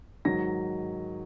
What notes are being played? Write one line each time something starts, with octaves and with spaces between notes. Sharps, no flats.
G#2 D#3 F#3 A#6